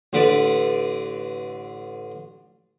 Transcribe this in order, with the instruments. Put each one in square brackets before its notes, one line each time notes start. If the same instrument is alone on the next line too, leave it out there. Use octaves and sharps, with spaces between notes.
[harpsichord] A1 D3 B4 D5